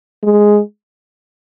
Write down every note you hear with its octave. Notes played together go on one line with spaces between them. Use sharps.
G#3